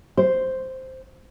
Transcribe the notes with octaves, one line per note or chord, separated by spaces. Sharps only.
C5